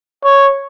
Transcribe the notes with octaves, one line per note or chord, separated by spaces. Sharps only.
C#5